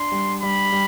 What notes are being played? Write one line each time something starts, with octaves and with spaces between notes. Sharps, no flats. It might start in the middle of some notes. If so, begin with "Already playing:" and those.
Already playing: D4 C6
G3
G3 B5
G3